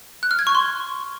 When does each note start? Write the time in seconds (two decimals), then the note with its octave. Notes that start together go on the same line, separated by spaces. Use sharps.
0.23 F#6
0.31 F6
0.39 G#6
0.47 C#6
0.55 C6